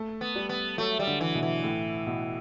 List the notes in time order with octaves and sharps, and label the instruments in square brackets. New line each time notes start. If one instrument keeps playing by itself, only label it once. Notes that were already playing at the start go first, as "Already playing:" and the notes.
Already playing: [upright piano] A3
[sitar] B3
[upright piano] G3
[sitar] B3
[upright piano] F#3 [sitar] A3
[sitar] G3
[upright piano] D3
[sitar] E3
[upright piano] B2
[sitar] E3
[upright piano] A2
B2